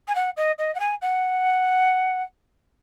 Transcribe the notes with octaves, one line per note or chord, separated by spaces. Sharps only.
G#5
F#5
D#5
D#5
F#5
G#5
F#5